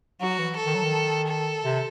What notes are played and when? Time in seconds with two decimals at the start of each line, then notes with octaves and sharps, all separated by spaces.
0.21 F#3 F#4
0.39 E3
0.57 A4
0.66 D#3
0.75 F#3
0.84 D#3
1.28 A4
1.64 C3